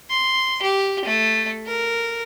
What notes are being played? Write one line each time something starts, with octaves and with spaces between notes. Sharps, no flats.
C6
G4
A3
A#4